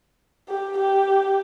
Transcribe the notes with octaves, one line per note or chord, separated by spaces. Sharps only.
G4
G4